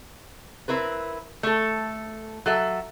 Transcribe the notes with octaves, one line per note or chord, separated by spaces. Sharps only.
C4 E4 A#4 B4
A3 A4
F#3 A4 E5